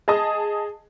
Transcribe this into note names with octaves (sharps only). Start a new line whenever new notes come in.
G#4 D#5 A5 D#6